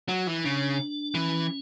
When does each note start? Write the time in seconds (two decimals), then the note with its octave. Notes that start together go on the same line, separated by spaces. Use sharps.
0.08 F#3
0.27 E3
0.44 C#3 D4
1.15 E3 C#4